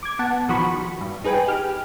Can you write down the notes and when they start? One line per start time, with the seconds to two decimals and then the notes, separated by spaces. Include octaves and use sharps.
0.03 D6 G#6
0.19 B3 F#5 A5
0.48 A#1 D#3 F3 F#4 B5 C#6
1.01 G2
1.24 D#4 G#4 B4 G5 G#5
1.48 G4 F6